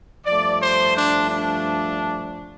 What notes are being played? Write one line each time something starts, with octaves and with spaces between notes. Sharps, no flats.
G2 F3 A3 D5
C5
D4
D4